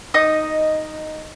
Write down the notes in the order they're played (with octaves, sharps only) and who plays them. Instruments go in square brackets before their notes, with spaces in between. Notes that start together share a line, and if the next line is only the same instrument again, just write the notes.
[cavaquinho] D#4 D#5 D#6